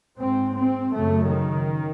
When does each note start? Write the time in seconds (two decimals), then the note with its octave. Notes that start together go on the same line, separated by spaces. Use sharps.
0.19 G#2 C4
0.57 C4
0.95 F#2 C#3 A3
1.32 D#3